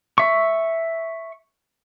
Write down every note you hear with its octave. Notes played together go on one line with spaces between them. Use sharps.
E5 C#6